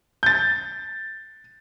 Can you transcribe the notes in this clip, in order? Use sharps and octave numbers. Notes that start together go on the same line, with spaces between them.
G6 A6